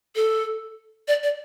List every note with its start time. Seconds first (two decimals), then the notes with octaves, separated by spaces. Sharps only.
0.16 A4
1.08 D5
1.23 D5